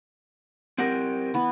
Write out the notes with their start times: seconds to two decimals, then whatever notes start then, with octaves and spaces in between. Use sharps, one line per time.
0.78 C4 G4 A#4 F#5
1.34 E3 B3